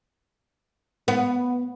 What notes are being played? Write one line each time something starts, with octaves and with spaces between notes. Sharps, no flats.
B3